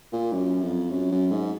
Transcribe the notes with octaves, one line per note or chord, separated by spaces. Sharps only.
A#2
F#2
F2
F#2
F#2
G#2